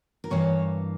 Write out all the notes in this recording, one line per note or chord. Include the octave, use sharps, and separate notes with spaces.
A#4
G2 E3 A#3 C#5